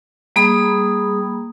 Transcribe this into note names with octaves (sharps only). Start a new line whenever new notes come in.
G3 A#3 G#4 B5 D#6